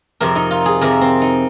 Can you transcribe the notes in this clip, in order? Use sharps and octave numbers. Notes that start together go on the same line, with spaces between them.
F2 C3 F3 A#4
D#4
F4
G#4
F2 C3 F3 A#4
C4
D#4